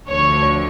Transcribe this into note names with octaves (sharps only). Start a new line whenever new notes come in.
D2 D3 F3 C#5